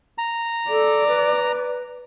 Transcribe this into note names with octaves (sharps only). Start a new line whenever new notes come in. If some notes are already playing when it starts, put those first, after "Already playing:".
A#5
A4 D5
B4